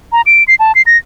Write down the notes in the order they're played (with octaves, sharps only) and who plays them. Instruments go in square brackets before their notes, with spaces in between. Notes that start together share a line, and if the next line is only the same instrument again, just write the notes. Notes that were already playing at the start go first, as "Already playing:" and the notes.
[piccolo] A#5
D7
C7
A5
C7
A#6